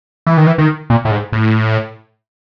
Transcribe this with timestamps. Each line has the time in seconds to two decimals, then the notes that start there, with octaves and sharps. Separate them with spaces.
0.27 E3
0.37 D#3
0.47 E3
0.58 D#3
0.90 A#2
1.05 A2
1.11 G#2
1.33 A2